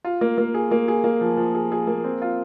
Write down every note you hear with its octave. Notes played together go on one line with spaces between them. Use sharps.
F4
A#3
A#3
G#4
A#3
G#4
A#3
F3
F3
G#4
G#4
A#3
C4
F4